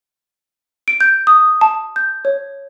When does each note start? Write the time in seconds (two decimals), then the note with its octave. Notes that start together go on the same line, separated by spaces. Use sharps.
0.88 D7
1.01 G6
1.27 D#6
1.61 A5
1.96 G6
2.25 C#5